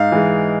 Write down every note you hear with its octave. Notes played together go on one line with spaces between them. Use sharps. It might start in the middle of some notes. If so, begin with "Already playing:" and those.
Already playing: G#2 F5
E3 G#3